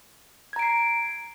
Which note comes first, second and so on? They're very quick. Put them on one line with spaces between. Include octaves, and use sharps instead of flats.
G#6 A#5 D7 C7